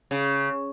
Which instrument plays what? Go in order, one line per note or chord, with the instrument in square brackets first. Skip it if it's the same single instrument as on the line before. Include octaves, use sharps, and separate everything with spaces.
[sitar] C#3